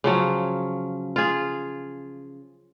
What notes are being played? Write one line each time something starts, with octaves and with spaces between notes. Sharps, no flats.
C#3 F3 F#3
F4 G#4